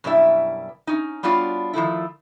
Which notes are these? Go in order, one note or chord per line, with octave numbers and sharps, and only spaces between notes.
F#2 B2 G3 D4 E4 E5
C#4 D#4
G3 B3 D4 F4 F#4 C#5
D#3 F3 A3 E4